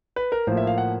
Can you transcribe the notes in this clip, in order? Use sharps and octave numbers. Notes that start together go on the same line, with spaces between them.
B4
A#4
A2 F3 A#3 C5
E5
F5
F#5